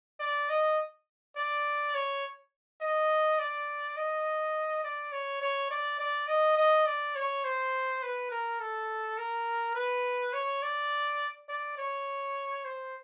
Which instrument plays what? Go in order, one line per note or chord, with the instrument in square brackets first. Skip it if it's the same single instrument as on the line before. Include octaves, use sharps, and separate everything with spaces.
[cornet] D5
D#5
D5
C#5
D#5
D5
D#5
D5
C#5
C#5
D5
D5
D#5
D#5
D5
C#5
C5
B4
A#4
A4
A#4
B4
C#5
D5
D5
C#5
C5